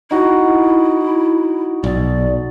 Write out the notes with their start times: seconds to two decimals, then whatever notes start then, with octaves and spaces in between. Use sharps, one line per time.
0.11 D#4 E4 F#4
1.84 B1 D5